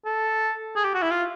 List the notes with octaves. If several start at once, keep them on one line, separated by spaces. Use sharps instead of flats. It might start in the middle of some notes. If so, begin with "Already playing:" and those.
A4
G#4
G4
F#4
E4
F4